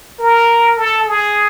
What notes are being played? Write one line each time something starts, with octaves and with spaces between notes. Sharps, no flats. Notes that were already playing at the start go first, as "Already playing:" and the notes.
A#4
A4
G#4